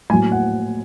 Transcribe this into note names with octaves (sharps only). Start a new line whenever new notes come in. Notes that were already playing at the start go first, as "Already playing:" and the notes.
A2 F#3 A#3 G#5
F#5